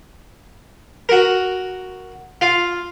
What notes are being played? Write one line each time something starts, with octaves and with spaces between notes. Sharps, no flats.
F#4 A#4
F4 F5